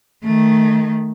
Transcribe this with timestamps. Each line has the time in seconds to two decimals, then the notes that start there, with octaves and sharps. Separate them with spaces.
0.24 D#3 A3